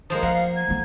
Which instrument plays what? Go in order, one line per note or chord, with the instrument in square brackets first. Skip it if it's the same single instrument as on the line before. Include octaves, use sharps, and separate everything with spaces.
[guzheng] F3 G#3 A#3 [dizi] D#6
[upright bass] F3 [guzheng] A#4 F#5 [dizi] F5
[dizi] G#6
[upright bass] E3 A3